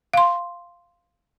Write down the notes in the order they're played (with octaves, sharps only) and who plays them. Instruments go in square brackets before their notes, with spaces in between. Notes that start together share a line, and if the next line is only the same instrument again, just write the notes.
[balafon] F5 C6